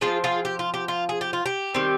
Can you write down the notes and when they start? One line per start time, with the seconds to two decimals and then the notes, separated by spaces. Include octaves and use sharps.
0.01 F3 G#3 F4 G#4
0.07 C4
0.24 F4 G#4
0.45 G4
0.59 F4
0.74 G4
0.88 F4
1.09 G#4
1.21 G4
1.33 F4
1.46 G4
1.74 D#3 G3 C4